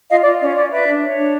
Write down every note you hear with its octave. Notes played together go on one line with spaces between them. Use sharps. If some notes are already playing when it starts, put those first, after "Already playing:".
F4 D#5 F5
D5
F4
C#4 D5
C#4 D5
B4 D5 E5
D4
C#5
D4